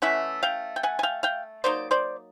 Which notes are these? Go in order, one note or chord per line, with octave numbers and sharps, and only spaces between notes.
E3 A3 C#4 E4 E5 F#5
F5 G5
G5
F#5 G#5
G#5
F5 G5
F5 G5
F#3 A#3 D#4 C5 D5
C5 D5